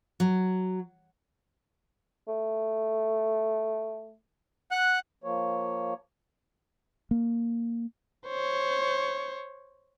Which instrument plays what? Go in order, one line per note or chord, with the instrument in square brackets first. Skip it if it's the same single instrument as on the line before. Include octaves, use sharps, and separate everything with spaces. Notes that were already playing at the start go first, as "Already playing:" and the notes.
[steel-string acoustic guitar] F#3
[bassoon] A3
[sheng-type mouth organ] F#5 F#6
[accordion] F3 A#3 C#5
[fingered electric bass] A#3
[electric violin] C5 C#5